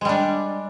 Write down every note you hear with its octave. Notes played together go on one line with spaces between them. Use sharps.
G3 G#3 D4